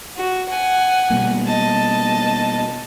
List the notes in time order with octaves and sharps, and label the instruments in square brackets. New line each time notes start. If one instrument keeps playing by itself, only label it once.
[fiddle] F#4
F#5 G#5
[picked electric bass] B2 G3 A#3
[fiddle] D#5 A5